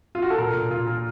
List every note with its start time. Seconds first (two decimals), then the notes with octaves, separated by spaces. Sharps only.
0.15 F4
0.22 F#4
0.30 A4
0.38 A#2 A#4
0.54 A#2
0.70 A#2 F4
0.87 A#2